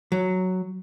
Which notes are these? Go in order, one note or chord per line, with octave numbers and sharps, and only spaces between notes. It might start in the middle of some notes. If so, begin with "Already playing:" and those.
F#3